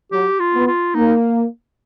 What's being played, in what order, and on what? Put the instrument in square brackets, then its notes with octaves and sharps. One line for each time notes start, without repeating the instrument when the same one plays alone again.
[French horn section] F#3 [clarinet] G4
[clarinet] F4
[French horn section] B3
[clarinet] F4
[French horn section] A#3 [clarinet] D#4